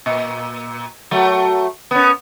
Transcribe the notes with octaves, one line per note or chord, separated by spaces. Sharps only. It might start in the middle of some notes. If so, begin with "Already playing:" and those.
A#2
F#3 A3
B3 C#4